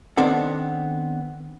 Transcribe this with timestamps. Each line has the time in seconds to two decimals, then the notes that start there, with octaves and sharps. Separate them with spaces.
0.17 D#3 B3 C4 D4 A4 F#5